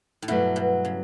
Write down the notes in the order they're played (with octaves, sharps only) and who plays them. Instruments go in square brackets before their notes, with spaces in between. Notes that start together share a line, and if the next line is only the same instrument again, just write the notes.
[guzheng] A2
[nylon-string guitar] G2 F#3 A3 E4 [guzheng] B2
[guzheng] B2
C#3